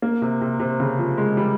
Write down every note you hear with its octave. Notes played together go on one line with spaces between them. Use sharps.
A#3
C3
C3
C3
C#3
F3
G#3
G3